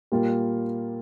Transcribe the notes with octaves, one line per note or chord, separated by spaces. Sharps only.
A#2 G3 A#3 F4